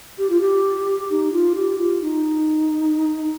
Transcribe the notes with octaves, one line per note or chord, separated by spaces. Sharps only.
G4
F4
G4
D#4
F4
G4
F4
D#4